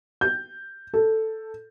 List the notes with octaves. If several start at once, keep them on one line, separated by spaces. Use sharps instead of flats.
G6
A4